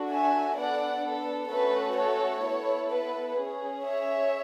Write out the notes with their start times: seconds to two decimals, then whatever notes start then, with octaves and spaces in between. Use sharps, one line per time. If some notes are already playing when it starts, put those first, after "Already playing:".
Already playing: D4 F#4 A4
0.11 E5 G#5
0.58 B3 D4 A4 D5 F#5
1.05 A4
1.51 A3 C#4 F#4 A4 B4
1.98 A4 C#5
2.45 B3 E4 A4
2.92 B4
3.39 C#4 G#4
3.86 C#5 E5